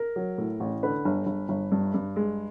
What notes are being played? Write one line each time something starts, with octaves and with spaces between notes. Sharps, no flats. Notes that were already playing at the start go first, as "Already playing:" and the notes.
Already playing: A#4
F#3
A2
A1
D3 B4
G1
G1
G1
G2
G2
G#3